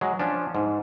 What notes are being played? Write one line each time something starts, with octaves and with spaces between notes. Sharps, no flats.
F#3 G#3
F3 C#4 D4
G#2